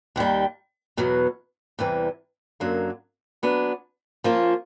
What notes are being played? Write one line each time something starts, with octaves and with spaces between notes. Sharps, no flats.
D#2 D#3 G3
E2 B2 F#3 B3
E2 C3 E3 G3
F#2 D3 F#3 A#3
F#3 B3 D4
F3 A#3 C#4 F4